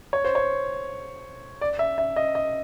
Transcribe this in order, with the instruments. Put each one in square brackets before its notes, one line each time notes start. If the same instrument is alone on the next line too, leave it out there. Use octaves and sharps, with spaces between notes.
[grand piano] C#5
C5
C#5
D5
E5
E5
D#5
D#5